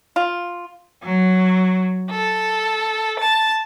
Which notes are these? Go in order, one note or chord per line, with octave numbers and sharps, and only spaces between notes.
F4
F#3
A4
A5